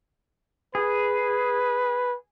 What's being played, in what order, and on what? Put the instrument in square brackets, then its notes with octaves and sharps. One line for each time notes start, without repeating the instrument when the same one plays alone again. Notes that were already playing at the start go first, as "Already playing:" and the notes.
[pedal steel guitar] G#4 [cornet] B4